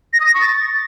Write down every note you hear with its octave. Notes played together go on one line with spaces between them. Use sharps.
A#6
D#6
A#6
C#6
A6